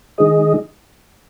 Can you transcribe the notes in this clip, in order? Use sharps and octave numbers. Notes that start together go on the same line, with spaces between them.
D#3 G#3 D#4 G#4 D#5